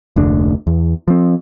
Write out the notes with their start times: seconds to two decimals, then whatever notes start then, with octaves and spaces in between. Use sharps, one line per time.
0.16 F1 D2 D4
0.67 E2
1.08 F3 C4